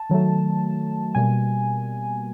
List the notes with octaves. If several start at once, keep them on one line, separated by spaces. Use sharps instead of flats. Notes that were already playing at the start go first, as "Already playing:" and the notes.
Already playing: A5
D#3 F#3 A3
B2 G3 A#3 G#5